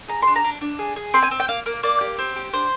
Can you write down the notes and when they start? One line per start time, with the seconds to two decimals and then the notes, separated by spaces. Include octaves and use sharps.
0.08 G#4 A#5
0.23 D4 C6
0.36 A#5
0.44 D4
0.61 D4
0.79 G#4
0.96 G#4
1.14 C4 C6
1.22 G#5
1.31 C4
1.40 G5
1.48 A#3 F5
1.66 A#3
1.83 A#3 D5
2.01 G4
2.18 C4
2.36 G4
2.53 D4 C5